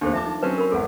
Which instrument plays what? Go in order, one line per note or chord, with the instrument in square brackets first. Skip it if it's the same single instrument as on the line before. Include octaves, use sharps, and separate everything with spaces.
[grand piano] F1 D#2 [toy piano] D4 A4 C5
[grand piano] F3 A5 [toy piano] E5 D6
[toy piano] D#4
[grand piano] F#3 C4 C#4 [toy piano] B4 C5 A5
[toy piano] A#4 B5
[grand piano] G#1 F2 B3 [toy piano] A4 F#5